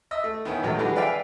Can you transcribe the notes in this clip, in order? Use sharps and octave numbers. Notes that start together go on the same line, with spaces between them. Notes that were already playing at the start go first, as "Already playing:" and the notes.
D#5 E5 E6
A3
D#3 B3 C#4 E4
A#1 E2 D#3 F#3 G#3 A3
D3 E3 G#3 F#4 G4 B4
B4 D5 E5 F5 G5 G#5